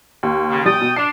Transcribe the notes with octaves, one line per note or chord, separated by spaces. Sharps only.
D#2
C#3
B1 G3 G5 D#6 A6
B2
D4 C7 E7